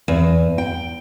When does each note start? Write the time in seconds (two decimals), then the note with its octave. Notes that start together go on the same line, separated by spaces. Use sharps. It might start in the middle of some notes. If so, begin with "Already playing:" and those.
0.08 E2
0.58 G5